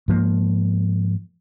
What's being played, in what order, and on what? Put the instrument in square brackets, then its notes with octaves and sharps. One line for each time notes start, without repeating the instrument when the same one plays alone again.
[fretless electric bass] G#2 F3 A#3